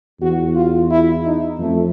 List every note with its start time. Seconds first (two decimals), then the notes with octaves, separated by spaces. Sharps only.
0.21 E2 F#4
0.56 F4
0.90 E4
1.25 D#4
1.59 F2 A3